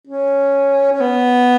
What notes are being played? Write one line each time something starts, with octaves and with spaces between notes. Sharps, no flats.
C#4
C#4
B3